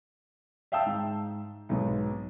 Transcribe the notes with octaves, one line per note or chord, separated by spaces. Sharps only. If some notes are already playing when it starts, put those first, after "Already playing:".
E5 F5 G5 A5 E6
G#2
B1 G#2 B2